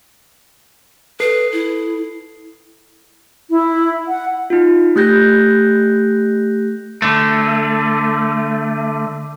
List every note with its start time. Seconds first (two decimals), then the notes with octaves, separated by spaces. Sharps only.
1.20 A4 B4 C7
1.53 E4
3.50 E4
4.08 F#5
4.50 D#4 F4
4.96 A3 G4 F#6 G6 A#6
7.02 D3 A3